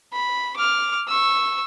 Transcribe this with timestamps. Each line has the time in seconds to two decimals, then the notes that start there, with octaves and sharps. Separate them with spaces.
0.13 B5
0.56 D6 F6
1.08 C#6 E6